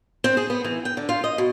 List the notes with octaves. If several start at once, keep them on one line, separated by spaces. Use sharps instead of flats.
C4
G#4
B3
E3
G5
D3
F4
D#5
B2